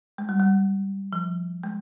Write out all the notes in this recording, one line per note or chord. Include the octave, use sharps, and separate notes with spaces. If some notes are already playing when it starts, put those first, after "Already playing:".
G#3
G3
G3
F3
G#3